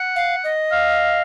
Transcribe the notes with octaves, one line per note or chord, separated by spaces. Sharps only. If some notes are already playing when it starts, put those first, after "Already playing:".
Already playing: F#5
F5
D#5
F5